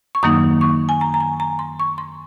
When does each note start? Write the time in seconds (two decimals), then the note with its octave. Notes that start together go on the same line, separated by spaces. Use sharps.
0.15 C#6
0.23 F#2 D#3 F#3 A#3 D#4 D#6
0.61 C#6
0.89 G#5
1.01 A#5
1.14 A#5
1.20 G#5
1.40 A#5
1.59 C6
1.80 C#6
1.98 C6